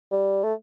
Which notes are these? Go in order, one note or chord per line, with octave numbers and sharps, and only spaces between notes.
G3
A3